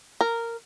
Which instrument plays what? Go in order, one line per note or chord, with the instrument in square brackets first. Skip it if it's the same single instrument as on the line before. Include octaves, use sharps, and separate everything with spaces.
[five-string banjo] A#4